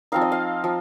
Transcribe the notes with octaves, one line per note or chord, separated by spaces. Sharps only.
F3 C4 D#4 F5
D#5
F5
F3